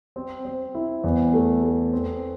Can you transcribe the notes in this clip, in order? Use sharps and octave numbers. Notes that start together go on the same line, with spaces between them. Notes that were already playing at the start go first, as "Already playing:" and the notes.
C4
C4
E4
E2
A3
A3
C4